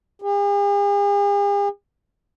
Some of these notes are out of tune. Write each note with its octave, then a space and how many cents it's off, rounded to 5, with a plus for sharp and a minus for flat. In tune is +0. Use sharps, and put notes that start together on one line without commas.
G#4 -45